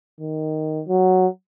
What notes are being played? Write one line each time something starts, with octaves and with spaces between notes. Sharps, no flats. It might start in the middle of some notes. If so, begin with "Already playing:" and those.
D#3
F#3